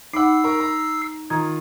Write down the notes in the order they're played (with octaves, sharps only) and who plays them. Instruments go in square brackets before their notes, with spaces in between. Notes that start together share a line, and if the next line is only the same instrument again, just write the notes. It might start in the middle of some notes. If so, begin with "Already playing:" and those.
[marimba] D#4 [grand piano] F#5 B5 D6 [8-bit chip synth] E6 C7
[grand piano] A#4 A#5 C#6
A#5
[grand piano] D#3 F4 D#6 [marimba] A#5 G#6